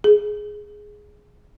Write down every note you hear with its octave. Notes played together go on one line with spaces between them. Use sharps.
G#4